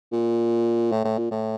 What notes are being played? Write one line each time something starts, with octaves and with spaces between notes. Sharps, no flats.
A#2
A2
A2
A#2
A2